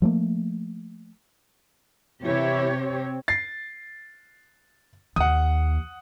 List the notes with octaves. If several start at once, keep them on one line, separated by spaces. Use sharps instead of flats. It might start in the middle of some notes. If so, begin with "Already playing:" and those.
F3 F#3 A3 A#3
C3 E3 E4 G4 C#5
C4
A6 C7
D#2 F#5 D#6